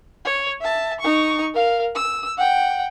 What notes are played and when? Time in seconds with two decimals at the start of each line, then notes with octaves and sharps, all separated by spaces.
0.25 C#5
0.61 E5 A5
1.00 D#4 C#6
1.54 A#4 F5
1.95 E6
2.37 F#5 G5